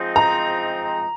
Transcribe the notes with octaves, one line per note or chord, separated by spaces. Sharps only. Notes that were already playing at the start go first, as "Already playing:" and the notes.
Already playing: F3 G#3 C4 D#4
A#5